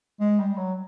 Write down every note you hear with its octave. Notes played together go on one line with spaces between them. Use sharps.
G#3
G3
F#3